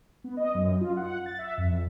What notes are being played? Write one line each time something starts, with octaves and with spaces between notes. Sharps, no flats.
B3
D#5
F#2
F4
F#5
A6
E5
F2